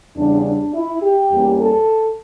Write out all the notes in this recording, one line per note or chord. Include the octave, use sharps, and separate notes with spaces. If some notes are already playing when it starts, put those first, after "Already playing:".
E2 C#3 G3 D4
D4
E4
G4
E2 E3 G3 A#3 C#4
A4